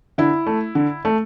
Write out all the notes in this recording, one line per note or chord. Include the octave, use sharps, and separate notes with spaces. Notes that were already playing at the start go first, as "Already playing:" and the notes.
D3 E4
A3
D3
A3